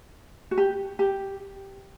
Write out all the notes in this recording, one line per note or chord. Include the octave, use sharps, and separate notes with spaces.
F#4
G4
G4